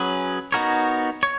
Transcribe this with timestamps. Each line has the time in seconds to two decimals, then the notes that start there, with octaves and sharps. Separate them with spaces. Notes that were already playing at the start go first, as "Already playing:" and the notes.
Already playing: F#3 C#4 G#4 B4
0.52 B3 D#4 F#4 A#4 C#5
1.23 C#5